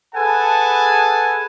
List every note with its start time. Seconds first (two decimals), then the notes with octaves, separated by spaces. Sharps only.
0.15 G#4 A4 B4 F#5 G#5 A5